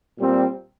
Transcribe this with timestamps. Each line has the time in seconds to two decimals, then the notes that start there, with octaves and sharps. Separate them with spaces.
0.18 A#2 G3 C4